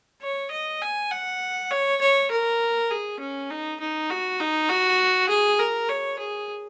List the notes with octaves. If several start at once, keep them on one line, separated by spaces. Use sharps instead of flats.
C#5
D#5
G#5
F#5
C#5
C#5
A#4
G#4
C#4
D#4
D#4
F#4
D#4
F#4
G#4
A#4
C#5
G#4